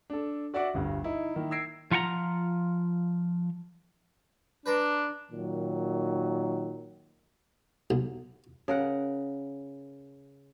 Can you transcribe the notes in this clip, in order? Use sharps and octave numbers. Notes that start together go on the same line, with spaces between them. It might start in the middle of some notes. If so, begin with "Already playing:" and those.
D4 A4
F#4 D5 E5 F#5 D6
G1 D2 G2
D#4 E4
D#3 A#3 E4
E6 G#6 A#6 C7 D7
F3 F4 F#5 G5 A#5
D4 B4 A#5 C6
A#2 D#3 F#3
B1
C#3 A#4 F#5